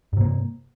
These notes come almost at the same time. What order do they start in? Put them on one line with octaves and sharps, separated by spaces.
G2 C3 A#3